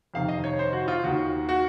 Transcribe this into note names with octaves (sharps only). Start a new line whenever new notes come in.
F2 C3 D#3 F5
D#5
C#5
C5
F#4
F4
D#2 D#3 F#4
F#4